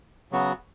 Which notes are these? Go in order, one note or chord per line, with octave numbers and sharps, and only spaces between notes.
C#3 F#3 B3 F#4